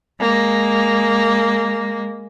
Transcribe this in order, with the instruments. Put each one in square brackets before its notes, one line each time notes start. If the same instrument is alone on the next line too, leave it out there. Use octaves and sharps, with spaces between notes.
[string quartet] G#3 A#3